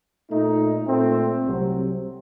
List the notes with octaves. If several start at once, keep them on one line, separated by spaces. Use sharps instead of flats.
A#2 A3 D#4
A#2 A3 C4
C2 C3 F#3 C4